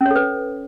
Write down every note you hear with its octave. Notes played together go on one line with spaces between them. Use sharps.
C#4 A4 B4 C#5